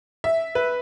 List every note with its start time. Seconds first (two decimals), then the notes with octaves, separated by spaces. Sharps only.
0.24 E5
0.55 B4